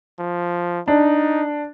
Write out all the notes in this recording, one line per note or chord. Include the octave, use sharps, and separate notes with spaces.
F3
D4 D#4